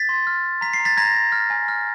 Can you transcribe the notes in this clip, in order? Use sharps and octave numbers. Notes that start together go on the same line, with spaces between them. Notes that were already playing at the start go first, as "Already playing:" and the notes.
Already playing: A6 B6
C6
F6
F6
A#5 B6
C7
A#5
A6 B6
A#5 G#6 A#6
A#5
F6
G#5
F6